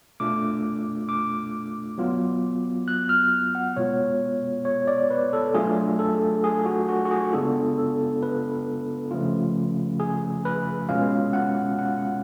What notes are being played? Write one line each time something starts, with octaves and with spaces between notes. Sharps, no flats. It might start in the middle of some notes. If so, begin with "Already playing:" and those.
B2 A3 D4 F4 D6
D6
F#3 B3 F4
F#6
F6
F#5
B2 G#3 B3 F4 C#5
C#5
D5
B4
A4
F#3 A3 D4 F4 G#4
A4
G#4
F#4
F#4
F#4
G#4
C#3 G#3 B3 D4 F4 A4
A4
B4
C#3 F3 A3 C#4 F4
G#4
B4
B2 G#3 C#4 F4 F5
F#5
F#5